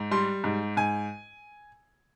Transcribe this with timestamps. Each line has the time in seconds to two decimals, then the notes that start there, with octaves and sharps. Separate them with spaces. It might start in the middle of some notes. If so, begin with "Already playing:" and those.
Already playing: G#2
0.11 G3 C6
0.44 G#2
0.77 G#2 G#5